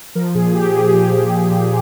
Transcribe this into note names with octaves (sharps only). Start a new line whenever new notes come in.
F3 A#4
A#2 G#4
F3 G4
A#2 G#4
F3 G4
A#2
F3
A#2